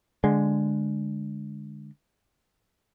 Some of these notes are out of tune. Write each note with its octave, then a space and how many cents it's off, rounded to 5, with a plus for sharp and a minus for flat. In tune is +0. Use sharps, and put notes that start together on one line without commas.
D3 +0 G#3 +0